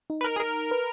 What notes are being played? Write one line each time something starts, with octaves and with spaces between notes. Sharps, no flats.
D#4
B4
A#4
G#4
A#4
B4